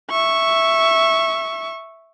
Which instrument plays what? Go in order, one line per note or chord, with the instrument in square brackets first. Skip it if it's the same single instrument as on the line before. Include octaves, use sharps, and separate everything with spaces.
[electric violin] E5 C#6